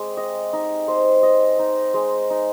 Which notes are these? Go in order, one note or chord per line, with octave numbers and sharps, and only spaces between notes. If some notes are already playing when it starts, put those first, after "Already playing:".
Already playing: G#3 C4 G4
D#5
D#4
C5
D#5
D#4
G#3
D#4